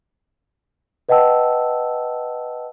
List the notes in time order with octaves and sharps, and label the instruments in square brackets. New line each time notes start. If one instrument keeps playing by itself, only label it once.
[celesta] B4 D#5 F#5 G5 A5 E6